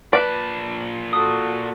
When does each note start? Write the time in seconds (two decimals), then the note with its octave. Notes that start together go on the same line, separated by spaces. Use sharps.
0.13 A#2 B4 D5 A5
1.13 F#4 A4 D#6